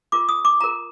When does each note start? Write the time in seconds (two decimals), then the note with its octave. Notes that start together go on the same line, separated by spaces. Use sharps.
0.12 F4 A#4 D6
0.29 D#6
0.45 D6
0.61 F4 A#4 A#5